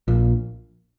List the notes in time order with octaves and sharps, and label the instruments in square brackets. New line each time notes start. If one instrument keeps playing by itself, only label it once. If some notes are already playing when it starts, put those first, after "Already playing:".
[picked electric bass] A#1 A#2